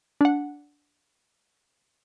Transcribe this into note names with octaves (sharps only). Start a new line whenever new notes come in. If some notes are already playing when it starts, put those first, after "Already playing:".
D4 F#5